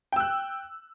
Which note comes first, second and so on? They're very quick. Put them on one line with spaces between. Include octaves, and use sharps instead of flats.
G5 E6 F#6